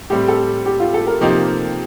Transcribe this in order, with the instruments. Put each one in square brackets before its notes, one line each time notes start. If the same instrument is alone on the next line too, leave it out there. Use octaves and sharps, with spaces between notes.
[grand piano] A2 G3 C4 [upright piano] G4
[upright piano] A4
G4
F4
A4
A#4
[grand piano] C3 F3 A#3 D#4 G4